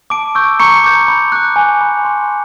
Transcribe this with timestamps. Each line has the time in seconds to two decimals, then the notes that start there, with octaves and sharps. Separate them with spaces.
0.10 A5 D6 D7
0.35 C#6 E6 G6
0.60 A#5 C#6 C#7
0.84 D6 G6
1.08 B5
1.32 D6 F#6
1.56 G#5
1.81 B5 D6
2.05 C6